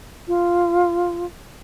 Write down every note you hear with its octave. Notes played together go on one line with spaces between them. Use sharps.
F4